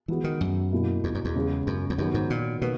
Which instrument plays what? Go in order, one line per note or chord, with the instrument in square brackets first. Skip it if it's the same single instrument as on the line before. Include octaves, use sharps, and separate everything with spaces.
[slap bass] E3 [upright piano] G#3 B3 F#4
[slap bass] D#3
F#2
[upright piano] B2 A#3 E4
[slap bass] E2
F#2
E2
[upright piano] C#3 G#3 B3
[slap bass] F#2
E2
[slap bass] F#2 [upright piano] D#3 F#3 B3
[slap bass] G#2
A#2
[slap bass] B2 [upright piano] D#3 A#3 B4